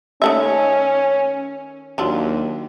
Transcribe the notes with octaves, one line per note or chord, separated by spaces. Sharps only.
D#3 A3 C#4 E5
D#2 F#3 D4 F4